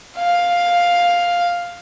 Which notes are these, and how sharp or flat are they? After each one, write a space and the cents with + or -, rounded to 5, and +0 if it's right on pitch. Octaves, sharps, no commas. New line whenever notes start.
F5 +5